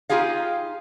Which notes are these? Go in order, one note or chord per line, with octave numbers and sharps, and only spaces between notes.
D#4 F4 G4 G#4 F5